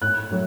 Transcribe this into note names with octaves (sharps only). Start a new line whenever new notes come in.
A2 F#6
F#3 A3